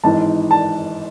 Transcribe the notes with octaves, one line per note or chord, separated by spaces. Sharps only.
G#1 G#2 E3 A5
A5